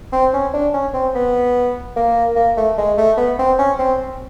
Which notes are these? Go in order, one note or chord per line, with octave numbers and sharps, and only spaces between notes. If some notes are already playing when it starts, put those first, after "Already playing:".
C4
C#4
D4
C#4
C4
B3
A#3
A#3
A3
G#3
A3
B3
C4
C#4
C4